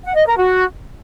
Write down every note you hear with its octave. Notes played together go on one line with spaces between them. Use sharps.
F#5
D#5
A#4
F#4